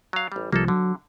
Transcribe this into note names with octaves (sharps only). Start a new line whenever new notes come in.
F#3 F5
A1 G3
C2 F3 G3 A#3 D#4 A4
D3 F#3